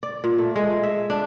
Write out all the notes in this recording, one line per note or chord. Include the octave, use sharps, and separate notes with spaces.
D5
A#2
A3
G#3
E5
D4